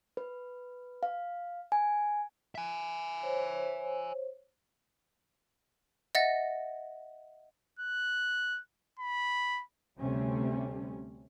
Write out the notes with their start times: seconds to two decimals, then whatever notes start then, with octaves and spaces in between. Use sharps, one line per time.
0.17 B4
1.03 F5
1.72 G#5
2.55 E5 G#5
3.23 C5 C#5
6.15 D#5 E5 F#5 A6 A#6
7.79 F#6
8.99 B5
9.99 D2 C3 G3 A3 C4 C#4